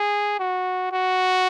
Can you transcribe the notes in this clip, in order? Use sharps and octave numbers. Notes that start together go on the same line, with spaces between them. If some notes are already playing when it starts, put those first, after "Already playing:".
Already playing: G#4
F#4
F#4